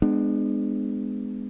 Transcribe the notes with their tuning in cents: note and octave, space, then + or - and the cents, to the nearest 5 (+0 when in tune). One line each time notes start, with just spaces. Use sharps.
G#3 +0 B3 +25 D4 +35